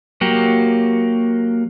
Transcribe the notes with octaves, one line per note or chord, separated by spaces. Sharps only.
F#3 A#3 G4